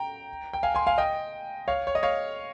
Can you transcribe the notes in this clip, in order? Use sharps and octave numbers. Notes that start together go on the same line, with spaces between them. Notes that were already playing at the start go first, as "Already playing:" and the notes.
Already playing: G5 A#5
G5
F5 G#5
G#5 C6
F5 G#5
D#5 G5
C#5 F5
C#5
D#5
C#5 F5